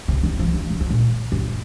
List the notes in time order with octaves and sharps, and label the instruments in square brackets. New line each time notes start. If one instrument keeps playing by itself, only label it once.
[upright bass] C3
D#3
F3
D#3
C#3
F3
A#2
F#2